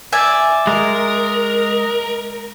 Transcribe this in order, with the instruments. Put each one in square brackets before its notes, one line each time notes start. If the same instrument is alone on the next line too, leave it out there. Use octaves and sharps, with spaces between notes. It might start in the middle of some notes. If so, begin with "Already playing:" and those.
[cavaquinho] D5 E5 G#5
[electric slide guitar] G#3 [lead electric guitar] A#4